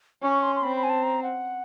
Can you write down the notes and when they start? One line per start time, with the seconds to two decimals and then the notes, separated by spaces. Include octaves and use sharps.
0.23 C#4 C#6
0.43 C6
0.56 C6
0.63 C4 B5
0.77 B5
0.83 G#5
0.89 A5
1.03 A#5
1.23 F#5